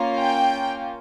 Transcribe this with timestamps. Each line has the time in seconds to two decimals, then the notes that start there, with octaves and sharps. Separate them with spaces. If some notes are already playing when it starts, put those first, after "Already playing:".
Already playing: A#3 C#4 F4
0.19 G5